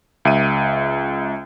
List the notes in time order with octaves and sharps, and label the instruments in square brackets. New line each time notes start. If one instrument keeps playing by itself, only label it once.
[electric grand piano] C#2 E5 D7 D#7